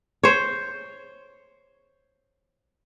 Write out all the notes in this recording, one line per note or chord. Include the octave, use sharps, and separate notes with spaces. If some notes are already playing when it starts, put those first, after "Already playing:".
C5 C#5